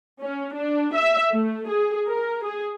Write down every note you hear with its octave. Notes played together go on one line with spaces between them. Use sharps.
C#4
D4
E5
A3
G#4
A#4
G#4